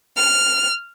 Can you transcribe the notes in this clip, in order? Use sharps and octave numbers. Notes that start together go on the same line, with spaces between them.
F6